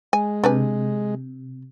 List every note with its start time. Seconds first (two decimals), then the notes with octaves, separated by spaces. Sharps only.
0.13 G#3 G#5
0.44 C3 D4 B4 G#5